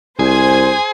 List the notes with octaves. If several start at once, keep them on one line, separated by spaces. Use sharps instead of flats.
C2 G#4 C5 G#5